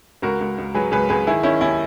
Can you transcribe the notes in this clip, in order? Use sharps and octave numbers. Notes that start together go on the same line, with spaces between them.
C#2 F#4 A#4
C#2
C#2
F#3 G#4 B4
C#2 G#4 B4
C#2 G#4 B4
D#3 E4 G#4
D#3 C#4 E4
D#2 C#4 E4